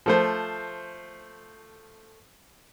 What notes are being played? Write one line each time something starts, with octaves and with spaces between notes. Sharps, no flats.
F3 A3 C5